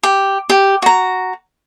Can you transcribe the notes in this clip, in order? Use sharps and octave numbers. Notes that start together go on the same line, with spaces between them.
G4
G4
F#4 A#5